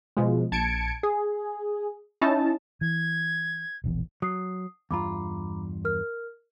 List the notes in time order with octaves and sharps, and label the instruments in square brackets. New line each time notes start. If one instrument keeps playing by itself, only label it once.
[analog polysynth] B2 F3 G#3
A#1 A5 G#6 C#7 D7
G#4
C#4 D#4 E4 A5
[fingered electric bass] E3 [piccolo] G#6
[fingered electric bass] E1 A#1 E2
[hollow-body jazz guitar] F#3 [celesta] D#6 C7
[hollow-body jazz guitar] E2 G2 F4 [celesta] A#5 B5 D6
[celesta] A#4 F6